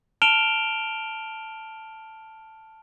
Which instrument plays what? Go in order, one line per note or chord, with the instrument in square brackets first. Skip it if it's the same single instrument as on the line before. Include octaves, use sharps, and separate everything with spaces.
[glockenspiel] A5 F6 D7 E7 F7 G7